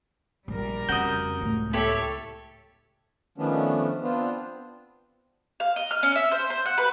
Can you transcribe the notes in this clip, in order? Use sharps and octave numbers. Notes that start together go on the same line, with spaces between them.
A#1 G3 A#4
F2 C#3 F#4 D#6 G6
C#2 A2
E4 G4 A4 C#5
D#3 F3 A3 B3 C#4 D4
B3 C4 D4 F4
F5
D#5
F6
C#4
E5
C5
C5
F#5
B4